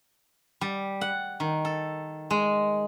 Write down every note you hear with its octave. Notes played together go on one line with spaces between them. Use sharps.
G3
F#5
D#3
A4
G#3